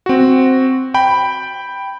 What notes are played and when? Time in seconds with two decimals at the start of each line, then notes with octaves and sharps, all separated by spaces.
0.06 C4 F#4
0.94 G5 B5